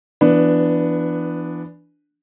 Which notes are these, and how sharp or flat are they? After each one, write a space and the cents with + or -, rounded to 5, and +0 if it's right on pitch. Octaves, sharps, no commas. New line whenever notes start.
E3 +30 B3 +0 D4 +0